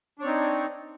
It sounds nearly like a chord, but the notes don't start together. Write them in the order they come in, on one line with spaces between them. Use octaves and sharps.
D4 C#5 C4 D#4